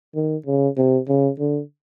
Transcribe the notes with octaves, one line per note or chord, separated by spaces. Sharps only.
D#3
C#3
C3
C#3
D3